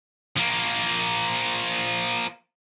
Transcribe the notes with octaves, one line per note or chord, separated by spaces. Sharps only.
F3 A#3